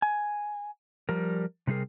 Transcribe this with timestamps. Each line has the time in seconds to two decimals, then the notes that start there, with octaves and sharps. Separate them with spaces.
0.02 G#5
1.09 F3 G3 A#4
1.67 C3 G3 D#4 G#4 A#4